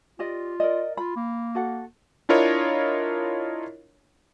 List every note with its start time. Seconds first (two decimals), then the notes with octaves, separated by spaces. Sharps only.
0.19 F4 G4 D5 D#5
0.60 A#4 D5 D#5
0.97 F4 B5
1.16 A#3
1.55 F#4 A4 F#5
2.29 D4 E4 F4 A#4 C#5 D#5